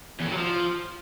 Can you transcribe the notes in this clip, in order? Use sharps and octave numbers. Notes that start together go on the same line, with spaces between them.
E2
A2
F#3
F3